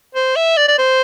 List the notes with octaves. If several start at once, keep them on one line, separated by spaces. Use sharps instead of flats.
C5
E5
D5
D5
C5